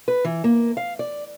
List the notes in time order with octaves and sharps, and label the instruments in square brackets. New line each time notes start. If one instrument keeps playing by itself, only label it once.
[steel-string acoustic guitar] B4
E3
A#3
F5
D5